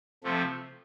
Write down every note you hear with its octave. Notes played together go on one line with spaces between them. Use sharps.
C3 F3 A3